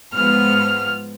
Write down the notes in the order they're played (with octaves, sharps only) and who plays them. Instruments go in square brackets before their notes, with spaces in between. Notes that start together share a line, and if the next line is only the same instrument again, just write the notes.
[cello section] G#2 F3 B3 [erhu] F6